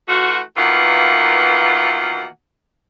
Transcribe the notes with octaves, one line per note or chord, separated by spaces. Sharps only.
E3 A3 F4 F#4
B2 D#3 E3 A#3 F4 F#5